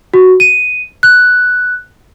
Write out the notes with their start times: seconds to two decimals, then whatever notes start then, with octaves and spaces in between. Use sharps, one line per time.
0.14 F#4
0.40 D#7
1.03 F#6